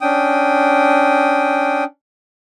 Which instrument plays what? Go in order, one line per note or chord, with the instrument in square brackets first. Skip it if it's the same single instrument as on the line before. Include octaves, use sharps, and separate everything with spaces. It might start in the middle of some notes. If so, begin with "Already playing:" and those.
[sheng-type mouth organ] C#4 D4 G5 D#6